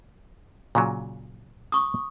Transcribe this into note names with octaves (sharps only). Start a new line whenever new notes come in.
A#2 C#3 F#3
C#6 D#6